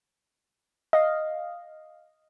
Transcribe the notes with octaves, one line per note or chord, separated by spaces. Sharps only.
D#5 F5